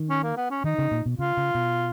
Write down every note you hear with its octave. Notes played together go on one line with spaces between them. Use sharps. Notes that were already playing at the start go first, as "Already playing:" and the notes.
Already playing: D#3
C#4
A#3
B3
C#4
D#3 D#4
C#3
A#2
B2
C#3 F4
C#3
B2